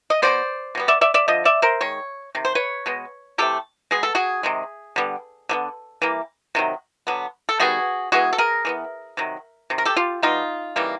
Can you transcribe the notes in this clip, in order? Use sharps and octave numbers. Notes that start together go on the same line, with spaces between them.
D#5
B2 G#3 B3 C5 D5
B2 G3 B3
D5 E5
D5 E5
D5 E5
D3 F3 D#5
D5 E5
A#4 C5
D#3 G#3 C#5
C3 D#3
C5
B4 C#5
B2 G#3 B3
C3 E3 A3 G4 A4
B2 G#3 B3 G#4
A4
F#4 G#4
C3 D#3 G#3
D3 G3 B3
D3 F#3 B3
E3 G3 A#3
C3 D#3 F#3
D3 F#3 B3
A4
D#3 G3 B3 F#4 G#4
E3 G#3 B3 F#4 G#4
A4
G#4 A#4
E3 G#3 B3
C3 D#3 F#3
C3 D#3
A#4
G4 A4
F4 G4
B2 G3 B3 D#4 F4
C#3 E3 G3 A#3